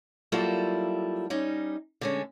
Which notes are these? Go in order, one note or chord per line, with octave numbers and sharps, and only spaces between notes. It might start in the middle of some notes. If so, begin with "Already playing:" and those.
F#3 G3 A#3 E4 F4 A4
G3 C#4 D#4
D3 G#3 C#4